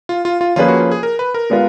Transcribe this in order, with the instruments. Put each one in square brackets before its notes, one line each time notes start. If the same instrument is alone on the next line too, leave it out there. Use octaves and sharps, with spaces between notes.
[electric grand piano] F4
F4
F4
[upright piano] F3 A#3 C#4 G#4 B4 [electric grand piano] F4
[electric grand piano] F#4
F4
G#4
A#4
B4
A#4
[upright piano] G#3 B3 F4